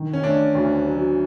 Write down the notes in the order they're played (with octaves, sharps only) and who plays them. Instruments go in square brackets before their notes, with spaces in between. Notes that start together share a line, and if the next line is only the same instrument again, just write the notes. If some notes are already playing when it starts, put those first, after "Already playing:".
Already playing: [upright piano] D#3
[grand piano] C#4
[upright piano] A3 [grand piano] D4
[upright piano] D2
F#3